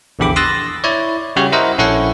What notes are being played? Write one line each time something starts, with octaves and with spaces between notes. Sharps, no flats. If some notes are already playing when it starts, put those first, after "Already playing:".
A#1 E2 D3 G4 B5 D6
C6 D#6 E6 F#6 A6 A#6
E4 C#5 D5
C#3 G3 F#4 G4 C#5
E4 A#4 C5 D#5 E5 F#5
A#1 C#4 E4 A4 C#5 F#5